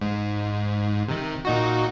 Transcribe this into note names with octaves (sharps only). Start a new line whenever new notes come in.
G#2
C3 D#3
A#2 D#4 F#4